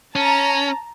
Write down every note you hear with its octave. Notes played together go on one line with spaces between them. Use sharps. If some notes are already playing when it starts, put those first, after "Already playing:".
C#4 A5 A#5